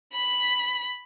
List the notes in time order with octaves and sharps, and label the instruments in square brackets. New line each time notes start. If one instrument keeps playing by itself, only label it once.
[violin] B5 B6